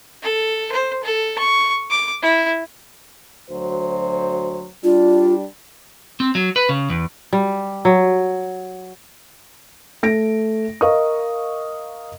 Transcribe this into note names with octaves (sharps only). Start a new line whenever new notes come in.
A4
C5
A4
C#6
D6
E4
D2 F#3 C5
G3 D4 F4
C4
F#3
B4
C#3
E2
G3
F#3
A3 A#6 D7
A#4 D#5 F5 C#6 D#6